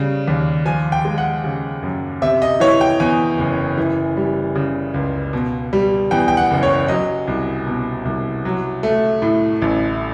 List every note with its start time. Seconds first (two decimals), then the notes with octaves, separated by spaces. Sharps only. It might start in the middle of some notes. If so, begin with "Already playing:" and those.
Already playing: C#3 G3
0.28 D#2
0.65 F3 G#5
0.92 G5
1.05 G#3
1.18 F#5
1.44 C#3
1.83 F#2
2.22 C3 E5
2.42 D#5
2.60 E3 C#5
2.81 G5
3.00 E2 G#5
3.38 F#1
3.78 E3
4.17 G3
4.55 C#3
4.94 C#2
5.33 B2
5.73 G3
6.11 E2 G5
6.28 G5
6.37 F#5
6.51 F#1
6.63 C#5
6.88 F#3 D#5
7.28 C2
7.66 B2
8.05 C2
8.45 F#3
8.83 A3
9.22 A2
9.62 A1